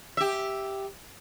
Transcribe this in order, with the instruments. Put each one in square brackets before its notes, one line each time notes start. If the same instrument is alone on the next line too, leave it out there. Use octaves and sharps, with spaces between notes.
[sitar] G4 E5